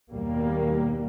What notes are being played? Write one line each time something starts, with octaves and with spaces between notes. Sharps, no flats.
D#2 B2 G3 A#3